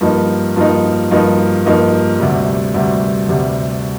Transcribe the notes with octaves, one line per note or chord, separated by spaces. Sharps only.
G2 F3 A#3 D#4
G2 F3 A#3 D#4
G2 F3 A#3 D#4
G2 F3 A#3 D#4
D2 C3 G3
D2 C3 G3
D2 C3 G3